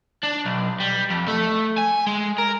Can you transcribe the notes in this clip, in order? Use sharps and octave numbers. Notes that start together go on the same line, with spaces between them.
D4
B1
G3
F2
A3
G#5
G#3
A#4